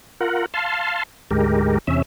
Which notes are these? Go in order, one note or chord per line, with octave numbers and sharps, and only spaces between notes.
F4 A#4 F#5
F5 A5 C6
D2 G#2 G#3 G4 A#4
E2 C3 C#4 E5